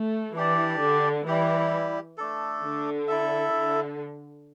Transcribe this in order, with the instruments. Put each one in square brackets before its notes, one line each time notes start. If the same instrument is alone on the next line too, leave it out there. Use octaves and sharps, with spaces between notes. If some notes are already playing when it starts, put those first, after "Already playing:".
Already playing: [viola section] A3
[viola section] E3 [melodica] D4 G4 D5
[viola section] D3
[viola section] E3 [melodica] G3 E4 G4
[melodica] A3 D4 A4
[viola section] D3
[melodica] E4 A4 E5
[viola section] D3